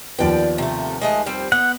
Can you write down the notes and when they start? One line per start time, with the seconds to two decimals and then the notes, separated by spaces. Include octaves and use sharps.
0.19 D#2 F3 B3 D5 G5
0.58 C3 A3
1.01 G#3 A3 D#5
1.26 G3 C4
1.52 B3 F#5